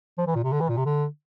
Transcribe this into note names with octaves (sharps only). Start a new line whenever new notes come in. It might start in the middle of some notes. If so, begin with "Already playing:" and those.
F3
E3
A#2
C3
D3
E3
A#2
C3
D3